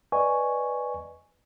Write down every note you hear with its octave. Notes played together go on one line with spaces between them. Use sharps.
B4 D5 D#5 G#5 C#6